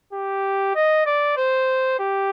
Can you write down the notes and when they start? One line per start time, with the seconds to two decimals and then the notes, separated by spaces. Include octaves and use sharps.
0.13 G4
0.75 D#5
1.06 D5
1.37 C5
1.99 G4